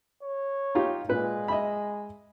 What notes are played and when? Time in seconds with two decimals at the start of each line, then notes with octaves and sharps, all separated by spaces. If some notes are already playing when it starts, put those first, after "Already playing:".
0.23 C#5
0.75 D#4 F4 G4
1.09 A#2 G#3 B4
1.48 D#5 E5 B5